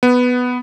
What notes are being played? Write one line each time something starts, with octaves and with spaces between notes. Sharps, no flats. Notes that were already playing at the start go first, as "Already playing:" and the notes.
B3